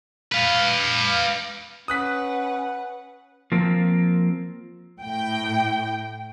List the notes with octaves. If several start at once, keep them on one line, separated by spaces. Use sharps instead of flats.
B4 F5
C#4 B4 F#5 D#6 F#6 B6
F3 A#3 C4
A2 G5